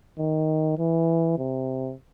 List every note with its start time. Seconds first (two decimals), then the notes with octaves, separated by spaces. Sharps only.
0.19 D#3
0.78 E3
1.38 C3